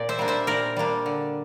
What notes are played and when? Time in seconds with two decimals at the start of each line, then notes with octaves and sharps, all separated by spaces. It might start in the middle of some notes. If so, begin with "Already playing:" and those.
Already playing: A#2 C4 D5
0.09 C5 E5
0.19 G3 A#3 D4
0.28 C5 E5
0.47 A#2 A#4 D5
0.77 G3 A#3 D4
1.06 D3